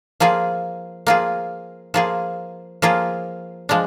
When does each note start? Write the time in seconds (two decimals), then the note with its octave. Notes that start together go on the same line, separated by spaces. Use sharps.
0.20 F3 A#3 F4 G#4
1.07 F3 A#3 F4 G#4
1.94 F3 A#3 F4 G#4
2.82 F3 A#3 F4 G#4
3.69 F3 G#3 D4